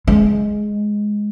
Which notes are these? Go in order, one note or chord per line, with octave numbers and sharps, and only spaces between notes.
G#3